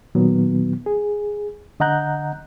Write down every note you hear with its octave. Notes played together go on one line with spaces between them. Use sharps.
A#2 D#3 F#3 B3
G#4
D3 D#5 F#5 A#5 F#6 G6